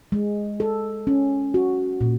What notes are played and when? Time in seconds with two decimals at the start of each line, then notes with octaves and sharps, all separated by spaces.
0.12 G#3
0.60 A4
1.07 C#4
1.54 F#4
2.01 A#2